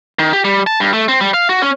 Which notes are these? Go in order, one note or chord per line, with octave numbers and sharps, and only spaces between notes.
D#3
G4
G3
A5
G2
A3
C4
G3
F5
F#4
C#4